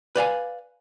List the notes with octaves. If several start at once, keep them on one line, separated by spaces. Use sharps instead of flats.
B4 D5 F5 G#5